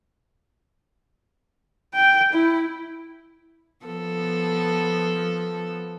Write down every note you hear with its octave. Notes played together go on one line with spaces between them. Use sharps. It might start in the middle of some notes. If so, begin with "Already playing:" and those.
G5
E4
F3 B3 A4